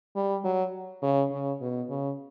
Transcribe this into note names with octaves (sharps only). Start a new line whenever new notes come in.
G3
F#3
C#3
C#3
B2
C#3